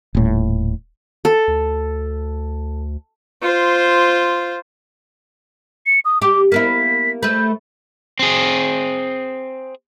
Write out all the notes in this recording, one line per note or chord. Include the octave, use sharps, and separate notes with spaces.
D#1 A2
A4
D2
F4 C5
C#7
D#6
G4 D6
A#3 B3 E4 B6
A3 B4 G6
C4 G#4